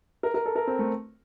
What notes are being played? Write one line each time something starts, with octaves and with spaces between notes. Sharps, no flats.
A#4
A#4
A4
A#4
C4
A3